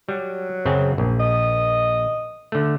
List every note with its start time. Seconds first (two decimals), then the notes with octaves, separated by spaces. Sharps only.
0.09 F#3 G3
0.65 F#2 C#3 C4
0.98 A#1
1.19 D#5
2.52 D3 A3